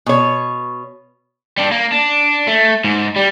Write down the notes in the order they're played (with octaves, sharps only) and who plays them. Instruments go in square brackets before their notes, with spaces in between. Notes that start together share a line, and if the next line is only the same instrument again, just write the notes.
[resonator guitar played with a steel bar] B2 C#5
[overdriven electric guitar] G3 D4
A#3
D4
A3
G#2
G3